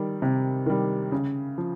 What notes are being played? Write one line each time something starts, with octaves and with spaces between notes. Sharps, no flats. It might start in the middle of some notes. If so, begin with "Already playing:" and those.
Already playing: D#3 G3
C3
D#3 G3
C#3
F3